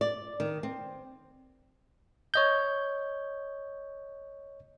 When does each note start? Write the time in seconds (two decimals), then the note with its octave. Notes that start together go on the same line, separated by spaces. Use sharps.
0.01 D5
0.40 D#3
0.63 C4
2.34 C#5 D#5 G6